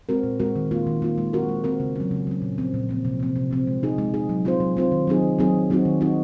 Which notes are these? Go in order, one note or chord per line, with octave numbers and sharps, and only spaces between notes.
G#3 C4 F#4 A#4
A#2
G#3 C4 F#4 A#4
D#3
A#3 F4
D#3
A#3 F4
G#3
C4 F#4 A#4
G#3
C4 F#4 A#4
C#3
F#3 C#4
C#3
F#3 C#4
A#2
F3 C4
A#2
F3 C4
C3
F3 C4
C3
F3 C4
G#3
D#4 G#4
G#3
D#4 G#4
F#3
C4 F4 C5
F#3
C4 F4 C5
D#3
F#3 C4 D#4 G#4
D#3
F#3 C4 D#4 G#4
D#3
F#3 C4 D#4 F#4
D#3
F#3 C4 D#4 F#4